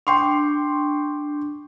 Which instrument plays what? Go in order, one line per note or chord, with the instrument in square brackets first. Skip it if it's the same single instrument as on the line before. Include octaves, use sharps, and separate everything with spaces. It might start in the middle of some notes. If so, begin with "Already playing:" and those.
[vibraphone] D4 [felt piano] G5 C6 C#6